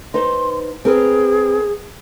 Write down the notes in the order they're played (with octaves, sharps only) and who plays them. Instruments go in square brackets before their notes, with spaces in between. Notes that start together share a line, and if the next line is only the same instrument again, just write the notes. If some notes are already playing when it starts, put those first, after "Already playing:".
[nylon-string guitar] D#4 B4 C5 [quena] C6
[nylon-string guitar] C4 A#4 B4 [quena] G#4